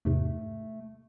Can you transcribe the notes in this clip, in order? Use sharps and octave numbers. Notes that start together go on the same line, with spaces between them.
E2 G#2 C3 A3